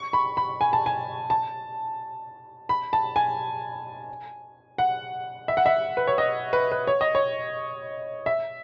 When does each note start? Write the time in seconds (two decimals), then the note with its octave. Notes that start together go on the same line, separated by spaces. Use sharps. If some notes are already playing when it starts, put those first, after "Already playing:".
Already playing: C#6
0.13 B5
0.37 B5
0.61 G#5
0.73 A5
0.86 G#5
1.30 A5
2.69 B5
2.93 A5
3.16 G#5
4.78 F#5
5.48 E5
5.57 F#5
5.66 E5
5.97 B4
6.07 C#5
6.18 D#5
6.53 B4
6.72 B4
6.87 C#5
7.01 D#5
7.15 C#5
8.26 E5